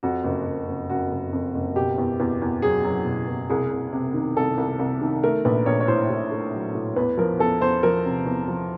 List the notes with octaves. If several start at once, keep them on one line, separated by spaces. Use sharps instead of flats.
F2 F#4
F#1
F#1
F#1
F#1 F#4
F#1
F2
F#1
B2 G4
E2
E2
E2
F#3 G#4
F#3
B2
E2
C2 G#4
C2
C3
D#3
C2 A4
C2
C2
D#3
A3 A#4
A#1 B4
A#1 C#5
C#5
A2 C5
A2
A3
F#3
A2
E2 B4
F3 A#4
E2 A4
E2 C5
F3 A#4
C3
E2
F3